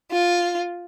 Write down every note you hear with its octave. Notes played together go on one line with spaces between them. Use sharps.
F4